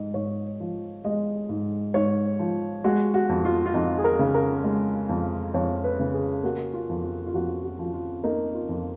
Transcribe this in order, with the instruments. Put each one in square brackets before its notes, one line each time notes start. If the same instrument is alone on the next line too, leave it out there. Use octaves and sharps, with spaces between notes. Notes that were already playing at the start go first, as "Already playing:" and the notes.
Already playing: [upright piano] G#2 D#5
G#2 C#5
F3
G#3 D#5
G#2
G#2 C#5
F3
G#3 F#4
F#4
F2
F4
F4
F2 D#4
G#4
A#4
C#3
A#4
G#3
F2
F2 C#5
B4
C#3
G#4
A#3 F#4
F4
F2
F4
F4
F2 F#4
F#4
F3
F4
A#3 D#4
F4
F2